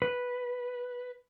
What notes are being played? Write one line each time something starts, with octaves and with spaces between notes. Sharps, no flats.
B4